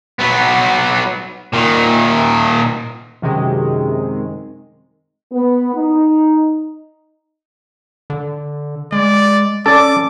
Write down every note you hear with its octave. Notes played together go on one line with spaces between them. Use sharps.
F#3 B3
A#2 D#3
F#2 C3 D#3 G#3
B3
D#4
D3
G#3 D5
C#4 A4 D5 D6